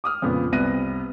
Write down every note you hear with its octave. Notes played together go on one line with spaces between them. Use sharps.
D6 D#6 F6
F2 A#2 C#3 B3
C2 C3 B3 F#6 A#6 D#7